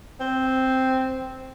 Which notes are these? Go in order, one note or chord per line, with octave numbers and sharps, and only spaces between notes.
C4